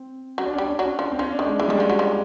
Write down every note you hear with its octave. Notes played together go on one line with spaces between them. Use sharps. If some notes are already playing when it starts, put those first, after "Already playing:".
Already playing: C4
F#3 C#4
D4
C#4
G3
D4
C#4
F#3 D4
C#4
F3
C4
F3 C#4
D4
D#3
G#3
E3 G#3
D#3 G3
F3 G#3
F#3
F3